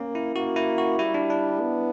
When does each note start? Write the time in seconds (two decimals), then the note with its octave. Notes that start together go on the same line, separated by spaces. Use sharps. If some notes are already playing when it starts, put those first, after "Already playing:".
Already playing: A#3 C#4
0.15 E4
0.36 A#3 F#4
0.56 E4
0.78 F#4
0.99 G3 E4
1.14 D4
1.30 D4
1.61 B3